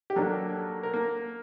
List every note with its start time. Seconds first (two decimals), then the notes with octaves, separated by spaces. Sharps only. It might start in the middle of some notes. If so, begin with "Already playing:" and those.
0.10 G4
0.16 F#3 A#3 D4 A4
0.83 A#4
0.94 A#3